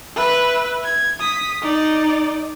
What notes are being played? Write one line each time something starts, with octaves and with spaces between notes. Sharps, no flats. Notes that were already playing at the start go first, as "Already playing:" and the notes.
B4 E5
G#6
D#6 B6
D#4 D5